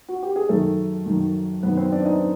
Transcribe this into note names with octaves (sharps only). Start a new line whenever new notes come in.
F#4
G4
G#4
F#2 D#3 A3 A4
F#2 D#3
F#2 D#3 B3 B4
C4 C5
D4 D5
D#4 D#5